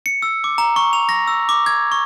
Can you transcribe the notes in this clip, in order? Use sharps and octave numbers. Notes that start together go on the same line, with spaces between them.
C#7
E6
D6
A#5
C#6
F7
A#6
E6
D6
G#6
C#6